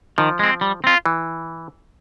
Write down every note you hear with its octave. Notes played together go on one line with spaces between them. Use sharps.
D#3 F3
G#3 C4
G3
C4 F4
E3